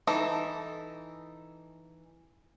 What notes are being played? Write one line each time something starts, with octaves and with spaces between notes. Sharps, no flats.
E3 D#4 A4